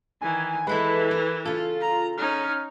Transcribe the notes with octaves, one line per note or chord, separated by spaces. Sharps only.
D#3 E3 G#5
E3 G#3 E4 A4 B4
A#4
C#3 F4 A4
A#5
C#4 D#4 F6